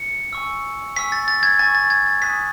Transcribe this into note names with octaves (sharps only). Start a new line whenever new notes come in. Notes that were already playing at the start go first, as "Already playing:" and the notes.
Already playing: C#7
G#5 C#6 E6
G#5 C#6 E6 B6
A6
A6
G#6
G#6
G#5 C#6 E6 A6
A6
G#6
A6
G#5 D#6 F#6 B6